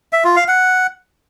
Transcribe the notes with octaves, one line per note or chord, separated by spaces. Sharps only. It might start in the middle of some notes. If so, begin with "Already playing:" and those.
E5
F4
F5
F#5